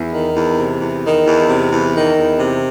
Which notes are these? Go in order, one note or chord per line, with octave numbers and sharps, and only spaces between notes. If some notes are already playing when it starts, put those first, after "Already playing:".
Already playing: E2
D#3
E2
C3
E2
D#3
E2
C3
E2
D#3
E2
C3